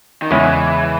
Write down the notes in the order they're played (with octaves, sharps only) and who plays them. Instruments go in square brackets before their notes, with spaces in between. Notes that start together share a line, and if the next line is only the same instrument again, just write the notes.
[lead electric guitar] D#3
[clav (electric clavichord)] E2 C#3 G#3 C#4 E4 [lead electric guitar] E3